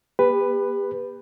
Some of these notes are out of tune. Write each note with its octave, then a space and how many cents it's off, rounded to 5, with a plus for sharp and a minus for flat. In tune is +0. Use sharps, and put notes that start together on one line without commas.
A#3 +45 G4 +35 B4 +5